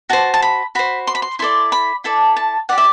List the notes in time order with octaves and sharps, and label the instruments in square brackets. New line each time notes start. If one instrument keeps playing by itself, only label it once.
[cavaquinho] F#4 C5 A5
A5
B5
F#4 C5 B5
C6
B5
C6
E4 A4 D5 C6
B5
E4 A4 D5 A5
A5
G4 D5 F#5
E5